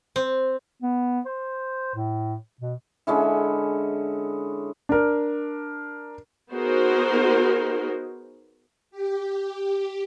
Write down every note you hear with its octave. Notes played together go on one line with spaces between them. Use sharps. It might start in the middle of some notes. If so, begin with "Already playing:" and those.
C4
B3
C5
A2
B2
D3 G#3 C#4 E4
D4 A#4
B3 D#4 F#4 G#4 A#4 C5
G4